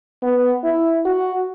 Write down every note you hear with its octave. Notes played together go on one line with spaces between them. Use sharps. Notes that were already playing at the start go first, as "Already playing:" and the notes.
B3
E4
F#4